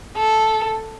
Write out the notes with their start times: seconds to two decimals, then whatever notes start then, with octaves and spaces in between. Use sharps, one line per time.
0.16 A4